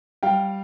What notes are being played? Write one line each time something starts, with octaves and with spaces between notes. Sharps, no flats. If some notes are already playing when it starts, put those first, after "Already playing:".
G3 F5 G5